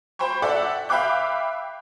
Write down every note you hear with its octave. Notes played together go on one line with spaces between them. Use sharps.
C5 G5 B5 C#6
A4 D5 E5 F#5
E5 F5 G5 B5 D6 F#6